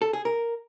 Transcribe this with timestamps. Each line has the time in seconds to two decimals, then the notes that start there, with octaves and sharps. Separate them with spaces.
0.02 A4
0.13 G#4
0.25 A#4